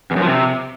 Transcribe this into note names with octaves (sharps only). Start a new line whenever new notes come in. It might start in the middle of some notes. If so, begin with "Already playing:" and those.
E2
F#2
F3
C3